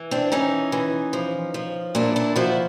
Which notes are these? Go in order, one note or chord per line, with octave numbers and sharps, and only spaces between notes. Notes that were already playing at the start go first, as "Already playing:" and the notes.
Already playing: E3
C4 D4
E3 C#4 D#4
E3
F3
F3
A#2 D4 E4
D4 E4
F3 E4 F#4